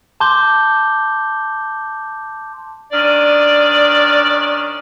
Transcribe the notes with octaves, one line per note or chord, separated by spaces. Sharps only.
A5 C6 D6 G6 G7
D#3 C#4 D4 D5